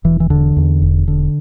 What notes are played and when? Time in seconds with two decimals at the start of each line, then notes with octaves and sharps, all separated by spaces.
0.04 E1 E3
0.20 E3
0.30 E2 D3
0.57 E2
0.82 E1
1.08 D3